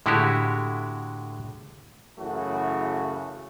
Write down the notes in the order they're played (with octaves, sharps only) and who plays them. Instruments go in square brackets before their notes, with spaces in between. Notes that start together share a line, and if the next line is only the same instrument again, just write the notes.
[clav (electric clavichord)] A2 D3 G#3 E4 F#4 G4
[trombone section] F#2 C#3 E3 A3 E4 F#4